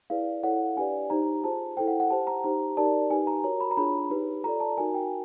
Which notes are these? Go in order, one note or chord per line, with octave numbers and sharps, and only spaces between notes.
E4 G#4 B4 D5 F5
E4 A4 C#5 F#5
D4 G4 B4 D5 G#5
D#4 G4 C5 A#5
F4 G#4 C5 A5
E4 A4 C5 G5
F#5
F#5
G4 C5 A5
A#5
D#4 G4 C5 A#5
D#4 G4 A#4 D5 A5
D#4 G4 B4 G#5
A#5
F#4 A#4 C#5 A#5
B5
A#5
D4 F4 G#4 C#5 B5
D#4 G4 B4
F4 A4 D5 A#5
A5
D#4 F#4 A#4 G#5
G5